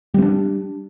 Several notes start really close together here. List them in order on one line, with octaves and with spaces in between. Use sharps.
G3 C4 D4